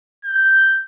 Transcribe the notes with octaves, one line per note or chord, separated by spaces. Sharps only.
G6